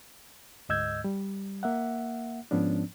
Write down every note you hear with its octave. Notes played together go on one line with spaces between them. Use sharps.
D2 G#2 D#5 E6 G6 G#6
G3
A#3 E5 F#5
G#2 F3 B3 C#4 D4